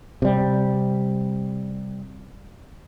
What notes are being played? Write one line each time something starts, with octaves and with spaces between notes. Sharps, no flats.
C3 G3